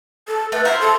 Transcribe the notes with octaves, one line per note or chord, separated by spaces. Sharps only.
A4
A3 B4
F4 A#4 C5 E5
A4